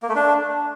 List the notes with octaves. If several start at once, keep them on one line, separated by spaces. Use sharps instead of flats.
A#3
A3
D4